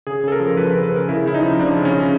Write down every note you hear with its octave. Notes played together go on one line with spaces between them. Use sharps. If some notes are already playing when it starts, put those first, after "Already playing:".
C#3 G#4
C#3 A4
A#4
F3
F3 B4
B4
C#3
B4
C#3 A#4
C#3 E4
C#3 E4
D#4
F3
F3 D4
C#3
C#4
C#3